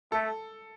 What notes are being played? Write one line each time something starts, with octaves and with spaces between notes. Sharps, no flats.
A3 A4